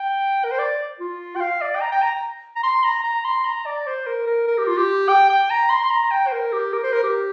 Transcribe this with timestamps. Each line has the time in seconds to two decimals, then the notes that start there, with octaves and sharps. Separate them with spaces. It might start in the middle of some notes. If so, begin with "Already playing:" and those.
Already playing: G5
0.44 A#4
0.51 C5
0.59 D5
1.00 F4
1.36 G5
1.41 F5
1.62 D5
1.76 G5
1.81 A#5
1.92 G5
2.02 A#5
2.56 A#5
2.64 C6
2.84 A#5
3.04 A#5
3.25 C6
3.45 A#5
3.66 D5
3.87 C5
4.07 A#4
4.27 A#4
4.47 A#4
4.58 G4
4.67 F4
4.77 G4
5.09 G5
5.30 G5
5.50 A#5
5.70 C6
5.82 C6
5.90 A#5
6.11 G5
6.27 C5
6.32 A#4
6.53 G4
6.73 A#4
6.83 C5
6.93 A#4
7.04 G4